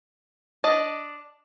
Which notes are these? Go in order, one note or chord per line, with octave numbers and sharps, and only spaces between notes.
D4 D5 D#5 A5